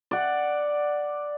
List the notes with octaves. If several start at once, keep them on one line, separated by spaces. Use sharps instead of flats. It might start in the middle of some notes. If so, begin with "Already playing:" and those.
D5 F#5